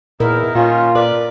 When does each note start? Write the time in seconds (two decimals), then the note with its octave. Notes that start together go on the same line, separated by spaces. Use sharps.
0.20 E2 A#2 D#4 E4 A#4
0.55 A#2 D#3 C#4 F4
0.95 A#4 B4 D5